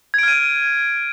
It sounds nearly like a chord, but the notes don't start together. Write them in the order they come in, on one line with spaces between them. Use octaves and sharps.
G#6 D7 F6 D#7